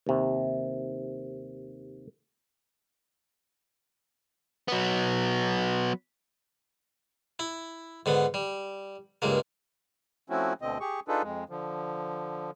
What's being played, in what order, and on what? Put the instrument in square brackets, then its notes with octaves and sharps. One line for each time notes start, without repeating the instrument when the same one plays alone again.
[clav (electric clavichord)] D#2 C3
[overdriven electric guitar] F#3 B3
[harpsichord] E4
G#2 D3 B3
G3
C#2 G2 G#3 A#3
[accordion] F3 A3 C4 C#4 E4 F#4
D2 B2 D3 C4 D#5
G4 G#4 C#6
D4 D#4 F4 G#4 A4 B4
F2 G#3
D3 F3